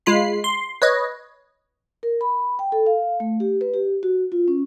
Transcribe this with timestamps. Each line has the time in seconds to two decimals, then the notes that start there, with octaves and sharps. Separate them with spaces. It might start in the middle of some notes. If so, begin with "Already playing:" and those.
0.06 G#3 F4 B5 C7
0.44 C6
0.82 B4 C#5 D#5
2.03 A#4
2.21 B5
2.59 G5
2.72 A4
2.86 F5
3.20 A3
3.40 G4
3.61 B4
3.74 G4
4.03 F#4
4.32 F4
4.48 C#4